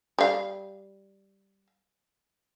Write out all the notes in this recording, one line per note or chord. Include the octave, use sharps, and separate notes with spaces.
G3 F5